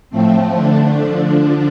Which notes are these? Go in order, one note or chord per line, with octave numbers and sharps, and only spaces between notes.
A2 F3 A3 C4
D3 A3 D4
D3 F3 D4